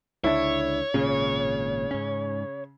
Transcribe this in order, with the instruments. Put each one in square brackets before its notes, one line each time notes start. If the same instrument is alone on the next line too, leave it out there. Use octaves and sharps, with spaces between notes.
[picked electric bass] C#2 D3 D4 [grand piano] E4 [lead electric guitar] C#5
[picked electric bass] G#1 A#2 C#4 [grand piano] C#3
[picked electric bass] G#2 C#4